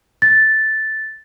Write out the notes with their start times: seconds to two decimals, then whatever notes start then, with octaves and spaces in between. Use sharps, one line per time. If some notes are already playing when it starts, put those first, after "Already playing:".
0.22 A6